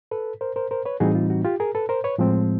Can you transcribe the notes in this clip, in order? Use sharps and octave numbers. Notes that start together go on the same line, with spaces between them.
A4 B4
A#4 C5
A#4 C5
A#4 C5
B4 C#5
A2 E3 G3 C4 D#4 F#4 G#4
F4
F#4
F4 G4
G#4 A#4
A4 B4
A#4 C5
B4 C#5
A2 F3 G#3 C4